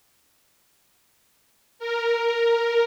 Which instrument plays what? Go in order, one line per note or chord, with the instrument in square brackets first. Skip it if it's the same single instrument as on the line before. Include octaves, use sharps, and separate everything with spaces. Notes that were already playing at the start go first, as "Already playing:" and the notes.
[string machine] A#4